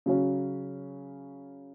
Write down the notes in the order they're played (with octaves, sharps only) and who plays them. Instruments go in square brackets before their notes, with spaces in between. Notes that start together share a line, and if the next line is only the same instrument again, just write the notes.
[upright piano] C#3 F#3 C#4